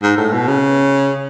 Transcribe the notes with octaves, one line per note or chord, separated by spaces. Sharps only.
G#2
A2
B2
C#3